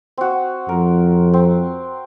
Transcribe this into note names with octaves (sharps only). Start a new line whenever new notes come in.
C4 F#4
F2 A#4
C4